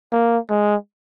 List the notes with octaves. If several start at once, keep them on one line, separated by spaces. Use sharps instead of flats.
A#3
G#3